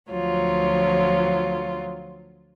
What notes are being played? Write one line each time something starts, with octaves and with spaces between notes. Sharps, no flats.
D2 F3 F#3 F4 C#5